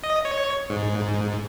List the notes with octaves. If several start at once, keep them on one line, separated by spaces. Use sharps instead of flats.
D#5
C#5
G#2